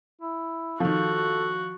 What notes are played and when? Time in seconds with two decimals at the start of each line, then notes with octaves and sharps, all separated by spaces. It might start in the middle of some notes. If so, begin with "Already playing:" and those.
0.21 E4
0.80 D#3 F3 F#4 A4